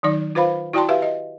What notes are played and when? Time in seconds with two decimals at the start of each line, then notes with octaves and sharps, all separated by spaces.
0.03 D#3 F#3 D#4 D5
0.35 F4 B4 C5 F5 B5
0.73 E4 F#4 D5 G5 A5 C6
0.89 G4 B4 E5 F5
1.02 D#5